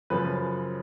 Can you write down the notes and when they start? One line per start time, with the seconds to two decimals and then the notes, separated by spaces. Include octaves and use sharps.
0.10 F#2 C#3 F3 B4